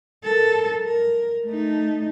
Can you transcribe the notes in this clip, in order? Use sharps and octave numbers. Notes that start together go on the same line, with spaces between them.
A4 A#4
A#4
A3 D#4